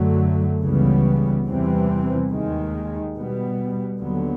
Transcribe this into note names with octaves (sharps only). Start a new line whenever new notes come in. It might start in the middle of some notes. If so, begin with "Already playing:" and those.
Already playing: F#2 D3 F#3 A3
C#2 C#3 E3 G3 B3
E2 C3 E3 G3 C4
D#2 D#3 G#3
B2 G3 B3
D#2 D3 F#3 B3